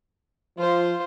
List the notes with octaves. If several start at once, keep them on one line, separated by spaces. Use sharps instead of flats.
F3 F4 C5